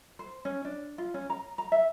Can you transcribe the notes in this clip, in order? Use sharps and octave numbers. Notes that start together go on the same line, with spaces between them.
C5
C#4
D4
F4
C#4
A#5
A#5
E5